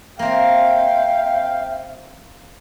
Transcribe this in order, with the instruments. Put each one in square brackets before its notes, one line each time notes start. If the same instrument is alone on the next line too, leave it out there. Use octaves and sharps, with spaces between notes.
[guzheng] A#3 C4 [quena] E5 [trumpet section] F5 G5